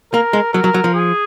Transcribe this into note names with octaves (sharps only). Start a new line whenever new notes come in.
A#3 A#4
G#3
F#3 A#4
F#3
F#3
F3
G#4